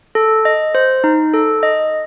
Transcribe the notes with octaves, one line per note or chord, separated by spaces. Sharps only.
A4
D#5
C5
D#4
A4
D#5